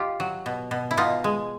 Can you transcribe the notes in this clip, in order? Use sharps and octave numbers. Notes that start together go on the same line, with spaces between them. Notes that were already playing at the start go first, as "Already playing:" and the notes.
Already playing: D#4 F4 G4
F#3
B2
B2
E4
B2 D#4 F4
G#3